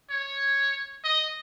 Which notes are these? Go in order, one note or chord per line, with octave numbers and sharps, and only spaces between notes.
C#5
D#5